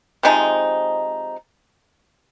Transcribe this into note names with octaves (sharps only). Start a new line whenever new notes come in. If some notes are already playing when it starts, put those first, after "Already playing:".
C3 F3 G#3 D#4